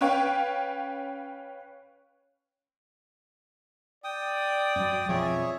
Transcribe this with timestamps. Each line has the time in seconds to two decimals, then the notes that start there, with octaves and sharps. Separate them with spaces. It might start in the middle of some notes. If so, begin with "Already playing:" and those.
0.01 C#4 B4 C#5 F5 G5
4.04 D5 G5 D#6
4.76 F#2 F#3
5.09 B1 F2 F3 G#4 C#5 E5